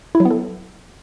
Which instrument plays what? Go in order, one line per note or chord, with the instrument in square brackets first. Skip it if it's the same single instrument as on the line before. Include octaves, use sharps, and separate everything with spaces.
[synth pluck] E4
F#3
B3
A4